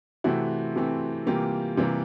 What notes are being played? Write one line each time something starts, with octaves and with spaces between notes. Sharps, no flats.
C3 E3 A3 C4 E4 F#4
C3 E3 A3 C4
C3 E3 G3 A#3 F4 G4
C3 E3 G3 A#3